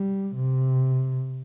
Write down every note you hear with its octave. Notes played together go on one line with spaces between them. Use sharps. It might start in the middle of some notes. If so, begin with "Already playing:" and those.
Already playing: G3
C3